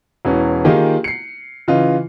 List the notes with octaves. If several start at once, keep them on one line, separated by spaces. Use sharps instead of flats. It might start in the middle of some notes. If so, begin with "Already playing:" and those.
E1 E3 C#4
D#3 A#3 D#4 F4 G4 G#4
C7 C#7
C#3 E3 F4 D#5